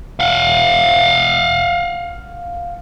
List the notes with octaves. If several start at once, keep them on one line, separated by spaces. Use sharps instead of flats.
F5 F#5